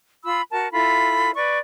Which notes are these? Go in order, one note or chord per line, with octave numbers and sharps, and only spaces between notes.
F4 B5 E6
F#4 A#4 A5
E4 F4 A4 B5
B4 D5 C#6